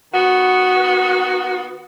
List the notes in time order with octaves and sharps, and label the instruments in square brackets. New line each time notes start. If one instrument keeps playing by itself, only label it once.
[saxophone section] D#3 B3 F#4